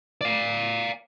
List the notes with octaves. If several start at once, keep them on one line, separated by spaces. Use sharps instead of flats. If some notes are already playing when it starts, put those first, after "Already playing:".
D5 F5